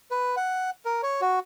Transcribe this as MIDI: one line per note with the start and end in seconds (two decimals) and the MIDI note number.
0.11 0.36 71
0.37 0.70 78
0.85 1.01 70
1.03 1.21 73
1.21 1.39 66